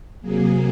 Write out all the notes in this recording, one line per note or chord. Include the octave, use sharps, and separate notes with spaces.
C3 F#3 A#3 G#4